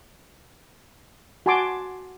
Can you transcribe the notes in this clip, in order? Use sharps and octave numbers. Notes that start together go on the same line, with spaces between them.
F#4 G#5 A5 C6 D6